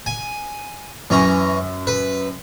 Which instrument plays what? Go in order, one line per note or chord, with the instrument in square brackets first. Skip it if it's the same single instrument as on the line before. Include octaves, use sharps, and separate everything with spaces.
[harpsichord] G#5
[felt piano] F#2 [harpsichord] E3 C#4 A#5
[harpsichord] B4